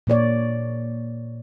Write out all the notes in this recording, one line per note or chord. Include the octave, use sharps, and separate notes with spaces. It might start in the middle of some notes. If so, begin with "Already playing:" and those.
A#2 A#3 C#5 D5